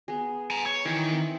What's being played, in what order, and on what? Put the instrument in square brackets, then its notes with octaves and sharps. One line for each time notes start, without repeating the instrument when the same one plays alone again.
[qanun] B3 G#4
[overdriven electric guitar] G#5 A#5
C#5
[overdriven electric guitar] D#3 [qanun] E3 E5
[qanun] C4